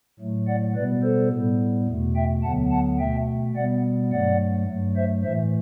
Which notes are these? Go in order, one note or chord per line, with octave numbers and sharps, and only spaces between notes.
A2 F#3 A3
D5 F#5
B2 G3 B3 B4 D5
A4 C5
A2 G3 B3
E2 B2 A3
E5 G5
D2 D3 F#3 B3 F#5 A5
F#5 A5
B2 A3 E5 G5
B2 G3 B3 D5 F#5
G2 F#3 A3 D5 F#5
G2 F#3 A3
C5 E5
A2 E3 A3 C5 E5